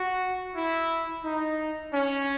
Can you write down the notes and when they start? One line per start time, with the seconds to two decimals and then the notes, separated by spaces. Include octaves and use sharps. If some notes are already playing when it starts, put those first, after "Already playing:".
Already playing: F#4
0.56 E4
1.24 D#4
1.93 C#4